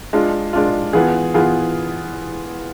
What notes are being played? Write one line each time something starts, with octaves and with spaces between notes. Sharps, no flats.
G#3 D4 F4
G#3 D4 F4
E3 B3 F4 G#4
E3 B3 F4 G#4